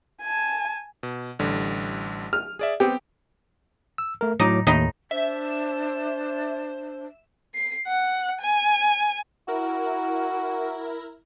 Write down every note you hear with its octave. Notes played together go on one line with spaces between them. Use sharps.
G#5 A5
B2
A1 D3 G3
F6
G#4 D5 E5
B3 C4 G4
E6
A3 A#4
A2 F#3 D#4 D6
D#2 A2 D#4
D4 C5 E5
C7
F#5
G#5
E4 F#4 A#4